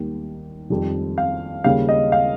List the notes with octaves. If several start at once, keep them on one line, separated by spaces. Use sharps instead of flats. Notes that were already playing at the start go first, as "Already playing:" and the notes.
Already playing: D#2 D#3 G3
F2 D#3 G3
F5
D#2 C#3 G3 F5
D#5
F5